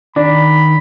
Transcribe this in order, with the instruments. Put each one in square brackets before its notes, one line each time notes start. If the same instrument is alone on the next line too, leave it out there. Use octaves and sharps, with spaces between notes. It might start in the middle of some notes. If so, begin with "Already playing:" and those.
[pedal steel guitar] D#3 [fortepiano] D4 [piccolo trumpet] B5